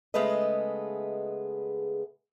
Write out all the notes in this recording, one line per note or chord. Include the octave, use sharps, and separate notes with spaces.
C#3 G#3 A3 B3 B4 D#5